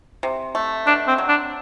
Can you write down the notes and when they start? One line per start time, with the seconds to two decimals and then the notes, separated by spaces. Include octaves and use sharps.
0.23 C3
0.55 A3
0.87 B2 D4
1.07 C4
1.18 F#3
1.28 D4